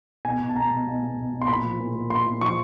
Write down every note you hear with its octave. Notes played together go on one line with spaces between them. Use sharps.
B2 G#5
B2
A5
B2 A#5
B2
B2
B2
B2
B2
C6
A#2 B5
F3
A#2
A#2
A#2 C6
A#2
F3 C#6